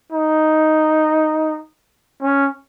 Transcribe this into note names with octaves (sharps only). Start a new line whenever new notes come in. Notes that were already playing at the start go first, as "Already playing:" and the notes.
D#4
C#4